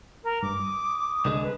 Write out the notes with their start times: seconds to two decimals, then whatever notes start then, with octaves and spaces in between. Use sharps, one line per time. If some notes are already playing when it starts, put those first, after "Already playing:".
0.24 A#4
0.42 G2 D6
0.59 D#6
1.25 C2 D3 G#3
1.42 B4